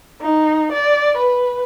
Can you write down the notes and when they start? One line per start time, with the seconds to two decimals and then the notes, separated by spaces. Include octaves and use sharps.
0.21 D#4
0.72 D5
1.17 B4